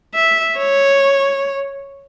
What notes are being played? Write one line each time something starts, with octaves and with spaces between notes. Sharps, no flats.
E5
C#5